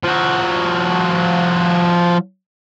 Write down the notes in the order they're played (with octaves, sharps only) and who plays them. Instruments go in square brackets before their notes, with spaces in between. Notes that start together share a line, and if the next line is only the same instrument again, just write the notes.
[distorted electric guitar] F3 F#4